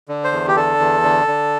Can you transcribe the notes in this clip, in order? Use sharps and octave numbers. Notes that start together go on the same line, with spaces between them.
D3
C5
E2
G4
D3 A4
E2
D3
D3